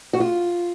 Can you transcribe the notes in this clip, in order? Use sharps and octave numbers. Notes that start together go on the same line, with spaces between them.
F#4
F4